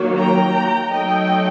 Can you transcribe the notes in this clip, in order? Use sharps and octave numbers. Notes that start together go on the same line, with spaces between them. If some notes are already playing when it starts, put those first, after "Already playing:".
Already playing: D#3 F#3 A#3
G5 A#5
F#3 A3 D#4 D#5 G5